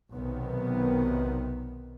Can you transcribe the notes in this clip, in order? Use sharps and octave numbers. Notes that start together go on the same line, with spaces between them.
B1 C3 D#3 B3